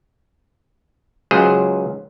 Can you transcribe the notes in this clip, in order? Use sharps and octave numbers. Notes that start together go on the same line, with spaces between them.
C#2 F#3 G#4 C5